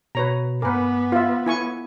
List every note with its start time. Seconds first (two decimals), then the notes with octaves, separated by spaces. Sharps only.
0.15 B2 B4 C#5 A#5
0.62 G2 B3 A#4 B4 G#5 D6
1.12 F4 B4 E5
1.46 E4 G#5 C#6